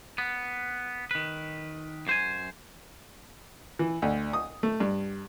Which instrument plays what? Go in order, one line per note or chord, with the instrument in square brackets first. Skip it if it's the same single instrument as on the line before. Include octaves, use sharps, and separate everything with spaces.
[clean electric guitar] B3
D#3 B4
F#2 C5 G#5
[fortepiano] E3
D2
D#6
A3
G2